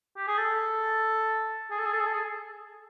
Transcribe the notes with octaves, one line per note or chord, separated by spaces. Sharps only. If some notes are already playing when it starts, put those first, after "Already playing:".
G4
G#4
A4
G#4
A4
G#4
A4
G#4
A4
G#4